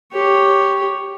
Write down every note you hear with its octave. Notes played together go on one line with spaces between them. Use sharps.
G4 C#5